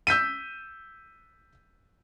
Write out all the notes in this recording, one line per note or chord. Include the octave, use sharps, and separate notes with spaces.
E6 G6 B6 D#7